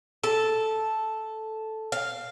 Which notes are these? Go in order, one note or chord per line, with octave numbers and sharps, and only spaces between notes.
A4
F5